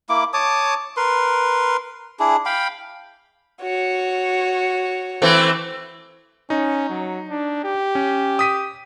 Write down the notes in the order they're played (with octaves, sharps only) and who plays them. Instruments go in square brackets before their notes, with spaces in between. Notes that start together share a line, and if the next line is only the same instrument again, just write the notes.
[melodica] A#3 E4 D6
C#5 A5 D6 D#6
A#4 B4 C6
D4 E4 G#4
F5 G5 B5
[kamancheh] F#4 C#5
[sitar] E3 A3 C4
[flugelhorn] C#4 [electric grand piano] D#4
[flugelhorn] F#3
D4
G4
[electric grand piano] C#4
D#6 B6 D#7